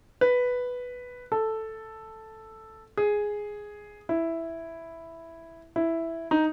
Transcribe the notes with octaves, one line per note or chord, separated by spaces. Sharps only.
B4
A4
G#4
E4
E4
D#4